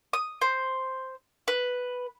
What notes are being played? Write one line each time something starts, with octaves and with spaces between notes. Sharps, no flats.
D#6
C5
B4